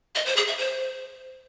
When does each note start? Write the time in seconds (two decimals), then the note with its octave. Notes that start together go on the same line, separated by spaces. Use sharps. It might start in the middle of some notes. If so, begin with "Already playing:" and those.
0.15 D#5
0.26 C5
0.37 G#4
0.47 E5
0.58 C5